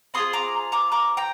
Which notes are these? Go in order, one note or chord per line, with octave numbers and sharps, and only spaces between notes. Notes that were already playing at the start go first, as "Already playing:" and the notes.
C4 F4 G#4 C6 D#6
A#5 D6
A#5 D6
A#5 D6
G5 A#5